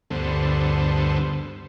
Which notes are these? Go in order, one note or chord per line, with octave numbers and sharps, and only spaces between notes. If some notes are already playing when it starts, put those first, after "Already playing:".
D2 G2 D3 B3 A4 C5